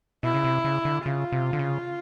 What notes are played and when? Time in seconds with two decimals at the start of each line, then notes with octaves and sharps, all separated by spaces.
0.23 B2 E4
0.34 C#3
0.44 C3
0.65 C#3
0.85 D3
1.06 C#3 F4
1.32 C3
1.53 D3
1.59 C#3